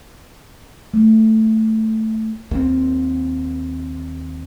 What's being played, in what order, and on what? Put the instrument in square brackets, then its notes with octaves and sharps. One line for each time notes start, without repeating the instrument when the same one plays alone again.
[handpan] A3
[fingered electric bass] D#2 C4